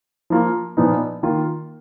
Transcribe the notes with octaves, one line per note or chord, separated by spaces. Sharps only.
F3 A#3 F4
A#2 F3 B3 D#4
D#3 A#3 F4